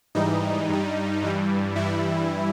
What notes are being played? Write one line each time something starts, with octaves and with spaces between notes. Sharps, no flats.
G#2 E3 G3 D#4
G2 G3
G2 E3 G3
G2 E3 G3 E4